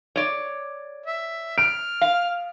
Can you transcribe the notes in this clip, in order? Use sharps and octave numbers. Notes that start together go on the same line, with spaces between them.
C#5 D5
E5
F6 D7
F5